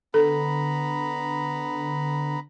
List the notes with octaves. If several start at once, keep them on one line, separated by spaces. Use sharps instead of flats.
D3 B3 A4 A#5 B5